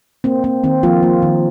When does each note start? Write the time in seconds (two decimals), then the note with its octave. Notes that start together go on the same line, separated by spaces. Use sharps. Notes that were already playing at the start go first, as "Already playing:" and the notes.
0.24 A#3 C4
0.44 A#3 C4
0.64 D#3 C4
0.83 F3 A#3 F4
1.03 A#3
1.22 D#3